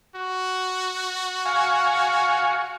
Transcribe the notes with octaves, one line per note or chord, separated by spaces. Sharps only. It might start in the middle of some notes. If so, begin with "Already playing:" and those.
F#4
F5 G#5 C#6